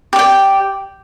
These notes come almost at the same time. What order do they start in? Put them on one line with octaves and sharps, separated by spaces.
G4 D5 G5